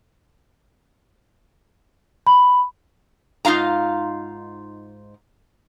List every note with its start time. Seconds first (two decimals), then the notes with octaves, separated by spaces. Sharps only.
2.27 B5
3.45 G#2 D#4 F4 F5 A#5